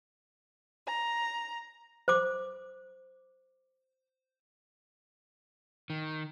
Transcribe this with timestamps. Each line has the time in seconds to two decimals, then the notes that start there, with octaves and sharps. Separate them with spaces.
0.85 A#5
2.08 C5 D6
5.90 D#3